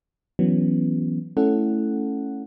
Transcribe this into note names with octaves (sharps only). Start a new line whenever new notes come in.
E3 F#3 B3 C#4
A3 C#4 E4 A4 F#5